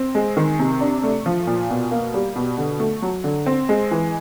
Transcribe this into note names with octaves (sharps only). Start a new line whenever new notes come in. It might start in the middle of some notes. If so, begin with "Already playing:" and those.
Already playing: C4
G#3
D#3
C3
D4
A3
F3
A#2
B2
A#3
G3
B2
D3
A3
F#3
D3
C4
G#3
E3